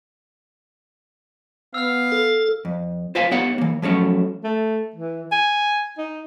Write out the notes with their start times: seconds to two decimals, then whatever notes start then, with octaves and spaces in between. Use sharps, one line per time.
1.74 B3 F5 E6 F6
2.12 A4
2.65 F2
3.15 F4 C5 E5 F5 G#5
3.31 B3 D#4 G4 C#5 E5 F#5
3.58 E3 A#3
3.82 F3 F#3 A3 C#4 F#4
4.44 A3
4.96 E3
5.32 G#5
5.98 D#4